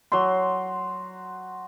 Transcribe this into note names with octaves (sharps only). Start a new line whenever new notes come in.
F#3 C6